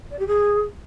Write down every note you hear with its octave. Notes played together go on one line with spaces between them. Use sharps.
D5
G4
G#4